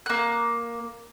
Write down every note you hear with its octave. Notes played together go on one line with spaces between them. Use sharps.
A#3 F#6